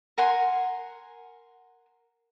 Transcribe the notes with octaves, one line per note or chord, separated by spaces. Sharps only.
A#4 F#5 G#5 C6